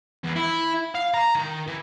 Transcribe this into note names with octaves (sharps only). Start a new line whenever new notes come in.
E2
E4
F5
A#5
D#3
E3